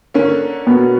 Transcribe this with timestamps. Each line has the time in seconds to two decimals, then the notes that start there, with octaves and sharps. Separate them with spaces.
0.14 D3 A#3 C#4
0.67 B2 B3